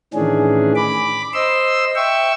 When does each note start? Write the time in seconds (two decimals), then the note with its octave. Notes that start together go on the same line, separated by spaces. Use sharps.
0.14 A2 D#3 E3 C#4 D4 G#4
0.75 B5 D6
1.34 C5 D#5 C6 E6
1.95 E5 G5 C#6 E6